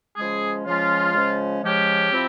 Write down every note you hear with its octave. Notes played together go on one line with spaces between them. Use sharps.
C#3 F3 G#3 C#4 G#4
C#3 F3 G#3 C#4 F4
C#3 F3 G#3 C#4
C#3 F3 G#3 C#4 G4
F3 C4 E4